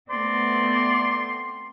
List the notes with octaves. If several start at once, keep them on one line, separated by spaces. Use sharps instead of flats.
A3 B3 C4 D5 C6